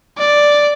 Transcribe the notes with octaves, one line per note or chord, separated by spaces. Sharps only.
D5